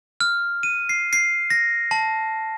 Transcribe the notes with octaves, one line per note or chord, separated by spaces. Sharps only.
F6
D#7
C7
C7
A#6
A5